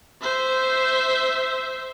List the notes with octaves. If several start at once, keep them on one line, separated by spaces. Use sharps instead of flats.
C5 E5